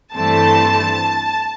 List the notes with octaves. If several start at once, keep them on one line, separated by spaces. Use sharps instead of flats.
G2 E3 A3 C4 A5